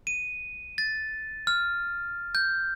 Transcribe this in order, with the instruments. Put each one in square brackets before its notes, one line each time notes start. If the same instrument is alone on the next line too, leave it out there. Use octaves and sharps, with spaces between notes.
[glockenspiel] D#7
A6
F6
G6